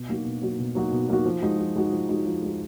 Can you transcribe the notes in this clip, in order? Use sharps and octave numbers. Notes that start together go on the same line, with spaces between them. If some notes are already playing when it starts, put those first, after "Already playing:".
Already playing: B2
F#3 A#3 D#4 F#4
B2
F#3 A#3 D#4 F#4
B2
F#3 A#3 D#4 F#4
B2
F#3 A#3 D#4 F#4
F3
G#3 D#4 F#4
F3
G#3 D#4 F#4
F3
G#3 D#4 F#4
F3
G#3 D#4 F#4